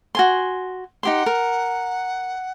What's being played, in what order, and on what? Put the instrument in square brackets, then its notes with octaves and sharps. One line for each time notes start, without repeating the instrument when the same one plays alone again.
[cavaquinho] F#4 G#5 C6
[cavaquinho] D#4 G4 C6 [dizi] F#5
[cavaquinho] A#4